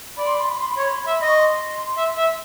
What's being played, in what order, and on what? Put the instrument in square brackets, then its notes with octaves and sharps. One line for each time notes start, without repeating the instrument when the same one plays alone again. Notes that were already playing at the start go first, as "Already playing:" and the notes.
[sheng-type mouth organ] D5 [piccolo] B5
[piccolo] C6
B5
C6
B5
C6
B5
[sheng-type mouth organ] C#5 [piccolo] C6
[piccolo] B5
C6
B5
[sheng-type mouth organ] E5 [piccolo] C6
[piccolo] B5
[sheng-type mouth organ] D#5
[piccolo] C#6
C6
[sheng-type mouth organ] E5
E5